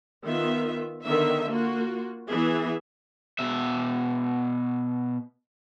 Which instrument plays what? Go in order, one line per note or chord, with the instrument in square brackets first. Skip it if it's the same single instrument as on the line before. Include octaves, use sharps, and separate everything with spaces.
[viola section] D#3 B3 F4 E5
D3 D#3 B3 E5
A#3 F4 F#4
E3 B3 G#4 E5
[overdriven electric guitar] B2 E5